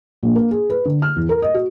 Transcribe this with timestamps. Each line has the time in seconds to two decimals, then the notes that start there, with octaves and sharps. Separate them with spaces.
0.23 A#1
0.35 A#3
0.51 G#4
0.70 B4
0.85 D3
1.02 F6
1.16 E2
1.29 A#4
1.42 D#5
1.54 F#4